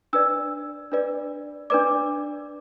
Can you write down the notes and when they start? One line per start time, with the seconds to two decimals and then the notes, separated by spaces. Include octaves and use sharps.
0.13 D4 B4 D5 E6
0.92 D4 B4 D5
1.70 D4 B4 D5 D6